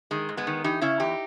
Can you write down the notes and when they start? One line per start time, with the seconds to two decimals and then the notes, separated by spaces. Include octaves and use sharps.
0.11 D#3 G#3
0.29 G#2
0.37 G#3 B3
0.47 D#3
0.64 E3 D#4 G4
0.81 C#3 C#4 E4
1.00 E2 D#4 G4